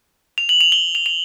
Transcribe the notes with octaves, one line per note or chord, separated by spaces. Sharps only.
F7
F#7
F7
G7
F7
F7